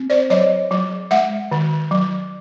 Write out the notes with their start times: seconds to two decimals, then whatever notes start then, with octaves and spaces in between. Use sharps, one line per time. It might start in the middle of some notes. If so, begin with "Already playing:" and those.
Already playing: C4
0.10 C5 D5
0.30 F#3 C#5 D#5
0.71 F#3
1.11 G#3 E5 F#5
1.51 D#3
1.91 F#3